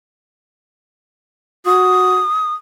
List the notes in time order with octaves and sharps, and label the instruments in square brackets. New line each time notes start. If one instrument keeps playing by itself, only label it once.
[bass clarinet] F#4 [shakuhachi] D#6